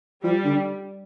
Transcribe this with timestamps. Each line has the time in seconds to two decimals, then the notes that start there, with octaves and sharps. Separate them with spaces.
0.24 F3 G3
0.44 D3